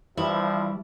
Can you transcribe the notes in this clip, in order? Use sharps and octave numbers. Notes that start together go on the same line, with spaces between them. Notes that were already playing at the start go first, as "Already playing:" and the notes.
G2 C3 E3 F3 G3 E4